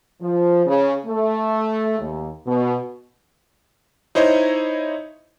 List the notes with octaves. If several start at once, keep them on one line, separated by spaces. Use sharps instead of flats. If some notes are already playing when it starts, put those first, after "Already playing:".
F3
C#3
A3
D#2
B2
D#4 E4 C5 C#5 D#5